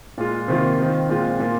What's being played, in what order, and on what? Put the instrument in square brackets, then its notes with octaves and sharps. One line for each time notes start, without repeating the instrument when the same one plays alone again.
[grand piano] A#2 G#3 F4
C3 D#3 A#3 F4
D#3 C4 F4
A#2 G#3 C4 F4
A#2 A#3 F4